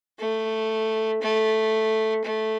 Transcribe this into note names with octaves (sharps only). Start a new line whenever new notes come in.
A3
A3
A3